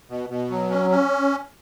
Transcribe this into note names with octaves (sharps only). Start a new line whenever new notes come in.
B2
B2
F#3
C#4
C#4